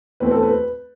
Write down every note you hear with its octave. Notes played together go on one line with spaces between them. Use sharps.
E2 B2 A3 C4 B4
A4
B4